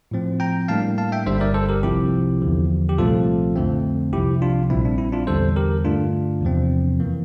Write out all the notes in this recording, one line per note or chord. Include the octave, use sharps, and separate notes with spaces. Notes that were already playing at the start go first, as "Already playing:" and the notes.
A2 F3 C4
G5 A#5
A2 G3 A#3 D4 F5 A5
F5 A5
E5 G5
G1 G2 D3 G3 C5 E5
A#4 D5
A4 C5
G4 A#4
C2 C3 F3 C4 E4 G4
E2 D3 F3
G4
C2 A#2 F3 A3 C4 F4 A4
F2 D3 A3 C4
C2 C3 F3 E4 G4
D4 F4
A#1 A#2 G3 C4 E4
D4
E4
D4 F4
E2 D3 G3 A4 C5
G4 A#4
G2 D3 A3 D4 F4
E2 C3 F3 C4
F2 E3 A#3